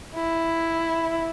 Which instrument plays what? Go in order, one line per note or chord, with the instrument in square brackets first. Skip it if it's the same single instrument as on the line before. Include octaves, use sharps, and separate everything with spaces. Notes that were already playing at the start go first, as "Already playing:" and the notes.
[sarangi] E4